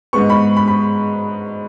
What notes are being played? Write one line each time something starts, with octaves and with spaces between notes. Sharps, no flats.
G#2 G#3 B3 C#6
B5
B5
B5